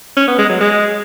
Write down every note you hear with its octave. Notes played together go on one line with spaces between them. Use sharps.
C#4
B3
G#3
F#3
G#3